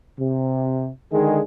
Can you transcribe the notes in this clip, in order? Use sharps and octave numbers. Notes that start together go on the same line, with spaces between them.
C3
D3 D#3 G#3 G#4